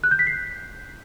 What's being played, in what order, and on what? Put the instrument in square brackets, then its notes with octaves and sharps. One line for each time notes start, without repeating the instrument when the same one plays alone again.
[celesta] F#6
G6
B6
C7